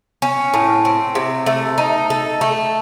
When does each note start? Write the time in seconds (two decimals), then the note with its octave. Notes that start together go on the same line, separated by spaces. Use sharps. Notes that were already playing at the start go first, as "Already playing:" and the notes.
0.22 C#4
0.54 A2
0.85 C4
1.15 C3
1.46 A3
1.78 D#4
2.10 A4
2.41 A3